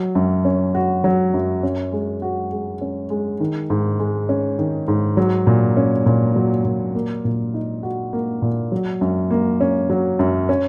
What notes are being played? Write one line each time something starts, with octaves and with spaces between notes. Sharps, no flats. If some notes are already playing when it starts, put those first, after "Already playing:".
Already playing: F#3
F#2
C#4
F#4
F#3
F#2
C#4
G#3
F#4
G#3
C#4
G#3
D#3
G#2
G#3
C#4
D#3
G#2
F#3
A#2
C#4
A#2
F#3
A#2
A#3
A#2
D#4
F#4
A#3
A#2
F#3
F#2
A#3
C#4
F#3
F#2
C#4